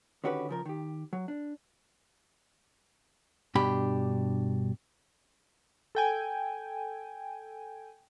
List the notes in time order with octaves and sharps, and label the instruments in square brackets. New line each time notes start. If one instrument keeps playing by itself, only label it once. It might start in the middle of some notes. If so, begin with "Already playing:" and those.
[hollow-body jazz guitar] D3 D#3 C#4 F#4 G4 B4
C#3 F3 A#4
D#3 G4
F#3
D4
G2 B2 D4 G4 B5
[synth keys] A4 G5 G#5